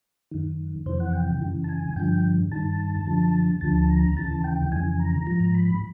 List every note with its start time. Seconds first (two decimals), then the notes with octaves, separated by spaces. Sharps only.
0.31 F#2 D#3
0.86 F2 C3 E3 C5
1.00 F#5
1.13 G5
1.27 G5
1.41 F#2 C#3 E3
1.64 A5
1.69 G#5
1.96 G2 D3 F3 G5
2.52 G2 D#3 A5
3.07 F#2 D3 F3
3.61 D2 D3 F3 A5
3.90 A#5
4.16 D#2 C#3 E3 A5
4.44 G5
4.72 F2 C#3 E3 G#5
5.00 A#5
5.27 G#2 F3 A#5
5.54 B5